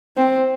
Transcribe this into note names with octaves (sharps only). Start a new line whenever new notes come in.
C4